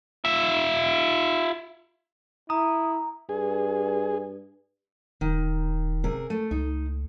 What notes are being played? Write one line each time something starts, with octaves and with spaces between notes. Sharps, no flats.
F4 E5
E4 A#5 D#6
G2 G#4
D#1 D#3
C3 G#4 A#4
A3
C#2 D#4